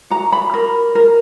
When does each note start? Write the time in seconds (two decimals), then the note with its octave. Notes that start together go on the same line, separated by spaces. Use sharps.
0.10 F#4 A#5
0.32 B5
0.54 A#4
0.95 A#4